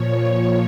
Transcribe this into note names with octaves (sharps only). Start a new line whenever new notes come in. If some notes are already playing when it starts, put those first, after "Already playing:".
Already playing: A#2 F3 C#5